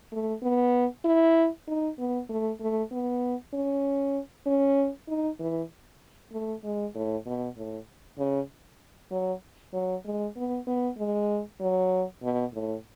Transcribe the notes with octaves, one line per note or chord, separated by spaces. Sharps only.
A3
B3
E4
D#4
B3
A3
A3
B3
C#4
C#4
D#4
E3
A3
G#3
A2
B2
A2
C#3
F#3
F#3
G#3
B3
B3
G#3
F#3
B2
A2